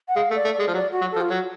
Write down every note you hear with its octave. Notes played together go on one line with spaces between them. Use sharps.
F#5
G#3 F5
A3
D5
A3
D5
G#3
F3
F#3 D5
F#4
F#3
F3 A4
F4
F#3 F#4